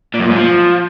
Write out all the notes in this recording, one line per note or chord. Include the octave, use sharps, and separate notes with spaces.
A#2
F#2
A#2
G#2
F3